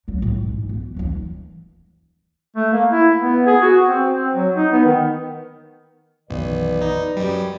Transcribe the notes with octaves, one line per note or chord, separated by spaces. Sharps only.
F#3 A#3
A2
G#2
B3
D#2 E3
A3
A#3
E4
B3
G#4
F#4
C4
C4
F#3
D#4
B3
D#3
B1 F#2 D#3 E3 B4 D5
D#4
F#2 F#3 G3